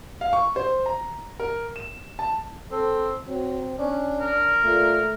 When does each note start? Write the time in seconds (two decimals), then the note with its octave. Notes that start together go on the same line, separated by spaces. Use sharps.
0.21 F5
0.33 C#6
0.56 C5
0.86 A#5
1.40 A#4
1.76 E7
2.19 A5
2.71 C4 A4
3.27 F#3 C4
3.78 C#4 D4
4.20 A#4
4.63 A#2 A3